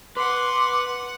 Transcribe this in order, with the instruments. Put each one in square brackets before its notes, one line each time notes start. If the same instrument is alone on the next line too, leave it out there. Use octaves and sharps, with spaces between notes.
[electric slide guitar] B4 [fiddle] F#5 [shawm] C6 [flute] D6